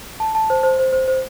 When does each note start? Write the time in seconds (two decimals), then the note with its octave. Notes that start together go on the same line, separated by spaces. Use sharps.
0.20 A5
0.35 A5
0.50 C5
0.63 C5
0.79 C5
0.92 C5
1.08 C5